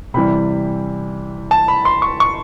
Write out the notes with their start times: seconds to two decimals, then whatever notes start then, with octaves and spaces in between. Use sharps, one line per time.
0.14 C3 E3 G3 B5
1.51 A5
1.68 B5
1.85 C6
2.02 C#6
2.20 C#6